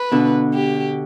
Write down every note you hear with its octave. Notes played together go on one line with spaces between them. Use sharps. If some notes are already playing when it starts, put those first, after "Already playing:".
Already playing: B4
B2 D3
G4